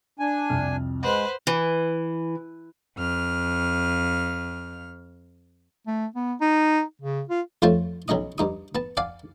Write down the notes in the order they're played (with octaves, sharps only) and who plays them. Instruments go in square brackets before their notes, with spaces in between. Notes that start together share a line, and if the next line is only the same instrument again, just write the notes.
[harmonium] D4 G#5
[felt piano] C2 F2 F6
[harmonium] G#3 [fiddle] B4 C5 [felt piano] F#5
[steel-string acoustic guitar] E3
[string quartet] F2 F6
[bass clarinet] A3
B3
D#4
C#3
F4
[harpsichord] F2 A3 F4 C5 C#5 A5
B1 F#3 C#4 D#5 D#6
G2 D#4 D#6
B3 A5
D5 F5 F#5 G#5